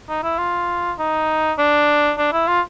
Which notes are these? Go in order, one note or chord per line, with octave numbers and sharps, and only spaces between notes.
D#4
E4
F4
D#4
D4
D4
E4
F4